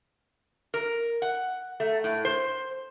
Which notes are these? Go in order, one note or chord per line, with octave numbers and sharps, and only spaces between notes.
A#4
F#5
A3
A2
C5